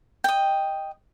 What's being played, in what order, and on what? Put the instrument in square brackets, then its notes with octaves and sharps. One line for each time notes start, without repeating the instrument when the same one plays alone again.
[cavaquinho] D#5 G5